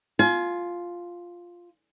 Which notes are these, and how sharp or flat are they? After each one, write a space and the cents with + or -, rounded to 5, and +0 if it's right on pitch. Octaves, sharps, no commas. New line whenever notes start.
F4 +0 G#5 +35